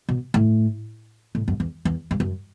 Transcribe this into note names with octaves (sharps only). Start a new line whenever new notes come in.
B2
A2
A2
F#2
E2
E2
G2
F#2